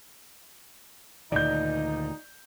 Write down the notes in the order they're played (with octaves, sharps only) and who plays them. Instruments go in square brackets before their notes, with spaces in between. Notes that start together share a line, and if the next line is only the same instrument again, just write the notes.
[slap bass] D2 A#2 D#3 [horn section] D#4 [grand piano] D5 G6